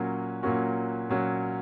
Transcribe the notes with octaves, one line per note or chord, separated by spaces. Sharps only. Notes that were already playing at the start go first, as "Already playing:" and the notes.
Already playing: A#2 F#3 A#3 C#4 F#4
A#2 F#3 A#3 C#4 F#4
A#2 F#3 A#3 C#4 F#4